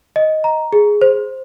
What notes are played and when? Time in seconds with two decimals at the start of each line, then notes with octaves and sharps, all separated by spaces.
0.16 D#5
0.44 A#5
0.73 G#4
1.01 C5